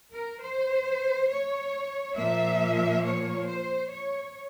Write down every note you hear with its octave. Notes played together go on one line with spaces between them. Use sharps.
A#4
C5
C#5
A#2 F3 A#3 E5
C#5
C5
C#5